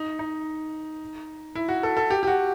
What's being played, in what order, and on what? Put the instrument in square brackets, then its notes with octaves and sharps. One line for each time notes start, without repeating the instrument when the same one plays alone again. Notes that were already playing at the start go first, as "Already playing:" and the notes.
Already playing: [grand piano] D#4
D#4
E4
F#4
A4
A4
G4
G4
F#4